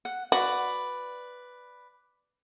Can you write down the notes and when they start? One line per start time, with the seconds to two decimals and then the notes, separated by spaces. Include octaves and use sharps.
0.05 F#5
0.32 F#4 B4 D5